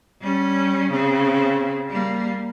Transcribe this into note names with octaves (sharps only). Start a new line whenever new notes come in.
G3 C#4
C#3 C4
G3 A#3